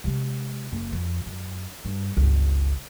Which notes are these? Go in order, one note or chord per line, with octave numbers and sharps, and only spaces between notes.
C3 G#3
F#1
F2
F#2
G2
G1 C#2